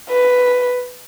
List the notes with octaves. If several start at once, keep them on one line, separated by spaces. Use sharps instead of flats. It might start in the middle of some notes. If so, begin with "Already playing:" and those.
B4